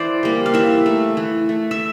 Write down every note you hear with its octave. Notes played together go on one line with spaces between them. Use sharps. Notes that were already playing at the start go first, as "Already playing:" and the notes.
Already playing: E3 C5 D5
G3 A#3
F5
E3 E5
A3
E3
A3
E5